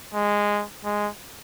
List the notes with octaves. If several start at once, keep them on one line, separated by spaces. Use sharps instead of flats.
G#3
G#3